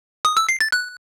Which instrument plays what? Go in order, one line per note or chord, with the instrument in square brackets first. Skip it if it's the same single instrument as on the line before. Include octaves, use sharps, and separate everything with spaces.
[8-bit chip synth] D#6
E6
C7
A6
F#6